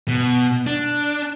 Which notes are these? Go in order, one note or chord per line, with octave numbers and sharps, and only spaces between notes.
B2
D4